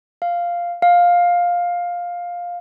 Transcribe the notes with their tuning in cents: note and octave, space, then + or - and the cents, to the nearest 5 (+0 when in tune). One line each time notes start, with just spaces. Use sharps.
F5 -5
F5 +10